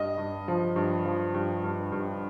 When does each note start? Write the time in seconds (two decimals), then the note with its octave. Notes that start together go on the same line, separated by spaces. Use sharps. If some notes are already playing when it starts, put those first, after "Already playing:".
Already playing: G2 D#5
0.18 G2
0.48 F3
0.76 G2
1.06 F3
1.34 G2
1.64 G2
1.92 G2